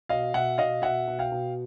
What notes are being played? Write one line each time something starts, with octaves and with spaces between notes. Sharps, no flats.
B2 D#5 F5
B2 E5 F#5
B2 D#5 F5
B2 E5 F#5
B2
F5 G5
B2